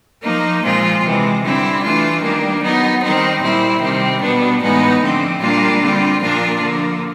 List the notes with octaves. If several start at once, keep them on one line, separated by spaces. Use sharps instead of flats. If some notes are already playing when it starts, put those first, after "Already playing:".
F3 A#3 D#4
A#2 F3 G#3 C4 F4
C3 E3 G#3
D3 G3 C4 E4
E3 A3 D4 F4
D#3 G3 A#3 D4
F#3 B3 D#4
D#3 G3 C4 D#4
A#2 G3 C4 E4
C3 D#3 G3 C4
B2 G3 B3 D4
A2 E3 G#3 B3 D#4
D3 F3 A3 C4
A#2 G3 A#3 D4 F4
D3 G3 C4 F4
A#2 F3 A#3 D4 F4
D3 F3 A#3